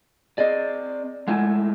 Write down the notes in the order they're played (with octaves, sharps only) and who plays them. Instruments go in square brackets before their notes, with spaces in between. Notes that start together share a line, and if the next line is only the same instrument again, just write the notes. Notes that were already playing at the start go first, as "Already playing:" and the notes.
[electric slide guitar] C4 D5 [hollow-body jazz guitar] G#4 D#5
[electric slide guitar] G#3 A3 E4 [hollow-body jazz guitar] F#5 G#5